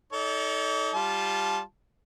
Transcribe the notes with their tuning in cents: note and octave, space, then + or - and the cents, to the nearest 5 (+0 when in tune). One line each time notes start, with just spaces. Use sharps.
D#4 +30 A4 +0 D5 -45
G3 +0 F4 +0 A5 -20